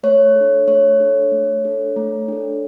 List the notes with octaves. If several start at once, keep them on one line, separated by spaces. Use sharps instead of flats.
A3 C#5
D4 A4
A3 C#5
D4 A4
A3
D4 A4
A3
D4 A4